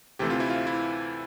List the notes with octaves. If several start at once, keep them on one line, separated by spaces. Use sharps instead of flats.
D2 C3 E3 A3 C4 G4
F4
E4
F4
E4